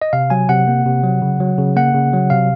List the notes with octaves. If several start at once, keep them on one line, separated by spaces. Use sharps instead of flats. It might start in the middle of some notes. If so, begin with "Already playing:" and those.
D#5
C3 F5
F#3 G#5
C3 F#5
A#3
C3
F#3
C#3
F#3
C#3
A#3 F#5
C#3
F#3
C3 F5